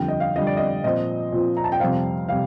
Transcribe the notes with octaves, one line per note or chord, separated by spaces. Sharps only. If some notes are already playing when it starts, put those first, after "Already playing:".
Already playing: F2 D3 G3 G5
D#5
F5
F2 D3 G3 D#5
D5
D#5
A#2 F3 C4 D#5
A#2 F3 C4
A#5
A5
G5
F2 C3 G3 C4 F5
C3 G3 F5